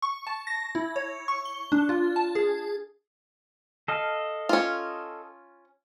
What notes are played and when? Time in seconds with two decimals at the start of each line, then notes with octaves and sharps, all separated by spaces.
0.02 C#6
0.27 A5
0.47 A#6
0.75 E4
0.96 C#5
1.28 C#6
1.45 G7
1.72 D4
1.89 F4
2.16 A5
2.35 G#4
3.88 A4 D#5 F5
4.49 C#4 F4